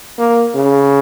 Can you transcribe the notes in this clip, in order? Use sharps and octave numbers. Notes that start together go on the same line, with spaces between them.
A#3
C#3